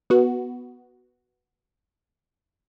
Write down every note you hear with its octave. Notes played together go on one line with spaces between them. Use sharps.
B3 F#4